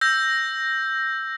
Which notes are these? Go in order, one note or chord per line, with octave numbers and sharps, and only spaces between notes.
E6 G6 A#6